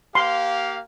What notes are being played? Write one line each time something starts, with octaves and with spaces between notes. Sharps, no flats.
A#3 G4 F5 C6